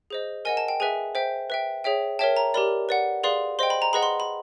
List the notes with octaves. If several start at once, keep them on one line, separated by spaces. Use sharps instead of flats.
G#4 C5 D#5
A#4 D#5 F#5 G#5
A5
G5
G#4 B4 E5 G#5
C5 E5 G5
B4 E5 G5
G#4 C#5 E5 G5
A#4 C#5 E5 G5 A5
A#5
G4 A#4 D5 B5
B4 D5 F#5
G#4 B4 D5 F5 C6
C5 D#5 G5 C6
B5
A#5
G#4 B4 D#5 F#5 B5
C6
B5